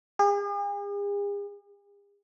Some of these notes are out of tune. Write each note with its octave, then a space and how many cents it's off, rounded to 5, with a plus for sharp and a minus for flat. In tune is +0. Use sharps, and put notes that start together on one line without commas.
G#4 -45